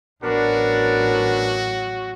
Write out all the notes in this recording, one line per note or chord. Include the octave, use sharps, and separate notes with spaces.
A1 F#3 B3 D4 F#4 A#4